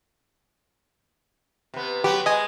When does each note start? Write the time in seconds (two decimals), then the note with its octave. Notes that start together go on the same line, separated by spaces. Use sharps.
1.74 C3 B3
2.04 F#3 B3 G4
2.26 G#3 D#5 G#5